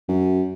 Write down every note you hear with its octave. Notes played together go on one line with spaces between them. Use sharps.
F#2